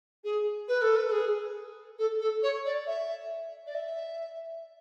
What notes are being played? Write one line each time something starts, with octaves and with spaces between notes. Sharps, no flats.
G#4
B4
A4
B4
A4
G#4
A4
A4
C#5
D5
E5
D5
E5